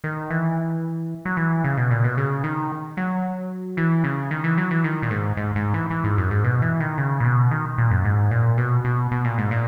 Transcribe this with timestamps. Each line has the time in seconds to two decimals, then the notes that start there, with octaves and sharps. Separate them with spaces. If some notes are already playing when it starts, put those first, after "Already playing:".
0.04 D#3
0.30 E3
1.25 F#3
1.37 E3
1.64 C#3
1.77 B2
1.91 A#2
2.04 B2
2.17 C#3
2.44 D#3
2.97 F#3
3.77 E3
4.04 C#3
4.31 D#3
4.44 E3
4.58 F#3
4.71 E3
4.84 D#3
5.02 A#2
5.11 G#2
5.37 G#2
5.56 G#2
5.74 E3
5.90 E3
6.04 G#2
6.18 F#2
6.31 G#2
6.44 B2
6.62 E3
6.80 D#3
6.98 C#3
7.20 A#2
7.25 B2
7.51 D#3
7.78 A#2
7.91 F#2
8.05 G#2
8.31 A#2
8.58 B2
8.85 B2
9.12 B2
9.25 A#2
9.38 G#2
9.51 A#2